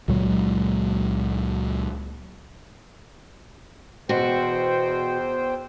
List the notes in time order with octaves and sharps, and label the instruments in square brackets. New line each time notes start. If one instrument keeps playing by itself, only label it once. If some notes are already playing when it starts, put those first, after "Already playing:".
[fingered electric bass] C#2 A#2 F#3 G#3
[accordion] E2 C5 G5 [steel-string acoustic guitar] B2 F#4